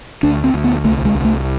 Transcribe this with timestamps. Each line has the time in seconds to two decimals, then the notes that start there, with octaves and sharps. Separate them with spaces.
0.23 D2 D4
0.44 C4
0.54 D2
0.64 B3
0.84 C2 A3
1.05 G#3
1.15 C2
1.25 A3